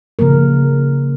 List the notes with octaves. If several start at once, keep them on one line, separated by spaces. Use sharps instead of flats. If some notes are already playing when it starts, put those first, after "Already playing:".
C#3 F3 A#3 A#4